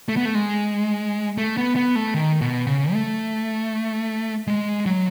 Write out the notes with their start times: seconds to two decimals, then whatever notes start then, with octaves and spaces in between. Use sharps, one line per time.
0.09 A3
0.17 B3
0.25 A3
0.35 G#3
1.38 A3
1.57 B3
1.76 B3
1.96 A3
2.14 D#3
2.41 B2
2.67 C#3
2.93 A3
4.47 G#3
4.86 F#3